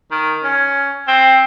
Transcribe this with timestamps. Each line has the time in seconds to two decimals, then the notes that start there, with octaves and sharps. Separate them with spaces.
0.11 D#3
0.44 C#4
1.08 C4